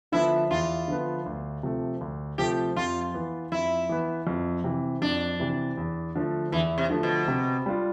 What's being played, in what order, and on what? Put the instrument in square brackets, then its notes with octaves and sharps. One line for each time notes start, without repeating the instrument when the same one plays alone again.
[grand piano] D3 F3 B3 [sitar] E4
[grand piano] E2 [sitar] F4
[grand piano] D3 F3 B3
D2
C3 F3 A3
D2
[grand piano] C3 F3 A3 [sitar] G4
[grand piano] F2 [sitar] F4
[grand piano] E3 B3
[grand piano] F2 [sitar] E4
[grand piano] E3 B3
F2
C3 E3
[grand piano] F2 [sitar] D4
[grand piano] C3 E3
E2
D3 F3 A3
[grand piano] E2 [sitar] E3
[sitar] C3
[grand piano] D3 F3 A3
[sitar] B2
[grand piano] C3
G3 D4 F4